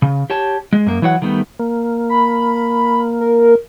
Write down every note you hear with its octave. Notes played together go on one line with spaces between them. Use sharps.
C#3
G4 C#5 A5
G#3
F#2 A#3
E3 F#3 C#5 F#5
D#3 G3 A3 B3
A#3
B5
A#4